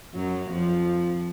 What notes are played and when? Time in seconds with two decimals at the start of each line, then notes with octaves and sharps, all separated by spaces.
0.14 F#2 F#3
0.51 F2 F3